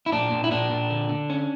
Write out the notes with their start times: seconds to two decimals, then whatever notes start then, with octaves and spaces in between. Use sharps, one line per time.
0.06 E4
0.12 A#2 D4
0.31 A#2
0.44 E4
0.51 A#2 D4
0.71 A#2
0.90 D3
1.09 D3
1.30 C#4